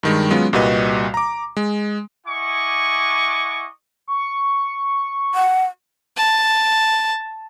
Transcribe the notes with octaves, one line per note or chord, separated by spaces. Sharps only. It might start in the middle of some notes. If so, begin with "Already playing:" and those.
G2 D#3 G#3
F#3 G#3 B3 C#4 F4
C2 A#2 G3 F#4 B4 D#5
A#5 D6
G#3
E4 D#5 F#5 G#5 C#6 D6
C#6
F#5
A5